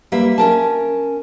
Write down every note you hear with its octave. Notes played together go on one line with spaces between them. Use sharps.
G3 A#3 B4 E5
C#4 A#4 A5